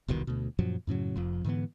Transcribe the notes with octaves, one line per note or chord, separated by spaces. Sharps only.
E1 C2 B2 D#3
D2 B2
F#2 A#2 F3 F#3
F#2 A2 C#3 F#3
F1 F2 F3
G#2 D3 E3 B3